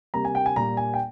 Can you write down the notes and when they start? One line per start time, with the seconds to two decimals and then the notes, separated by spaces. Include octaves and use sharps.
0.14 C3 G3 A#3 A#5
0.25 G#5
0.35 G5
0.46 G#5
0.56 A#2 G3 A#3 A#5
0.77 G#5
0.94 G5